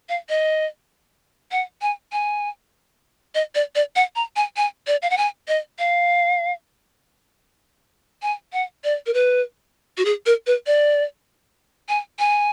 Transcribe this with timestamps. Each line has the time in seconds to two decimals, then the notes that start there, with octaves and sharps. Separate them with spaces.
0.09 F5
0.29 D#5
1.52 F#5
1.82 G#5
2.12 G#5
3.35 D#5
3.55 D5
3.75 D5
3.96 F#5
4.16 A#5
4.36 G#5
4.57 G#5
4.87 D5
5.02 F5
5.10 F#5
5.18 G#5
5.48 D#5
5.79 F5
8.22 G#5
8.53 F#5
8.84 D5
9.06 A#4
9.14 B4
9.98 F#4
10.05 G#4
10.26 A#4
10.47 B4
10.67 D5
11.89 G#5
12.19 G#5